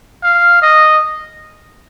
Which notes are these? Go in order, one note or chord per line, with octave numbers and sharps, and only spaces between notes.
F5
D#5